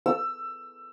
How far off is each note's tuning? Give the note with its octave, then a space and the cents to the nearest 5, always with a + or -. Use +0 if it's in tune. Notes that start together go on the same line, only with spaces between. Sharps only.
E6 +20